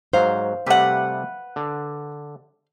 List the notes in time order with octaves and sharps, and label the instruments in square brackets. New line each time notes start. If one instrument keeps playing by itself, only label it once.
[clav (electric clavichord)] G#2 F#3 [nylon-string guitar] C5 F5
[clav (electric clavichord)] C3 G3 A3 [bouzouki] B4 F#5
[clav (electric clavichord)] D3